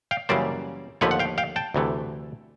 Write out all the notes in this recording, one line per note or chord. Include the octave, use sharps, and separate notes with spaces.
F5 G5
F#2 C#3 E3 G3 A#3 C5 D5
D#2 D3 F3 A3 B4 C#5
F#5
F5 G5
F5 G5
G5 A5
D2 C3 E3 A3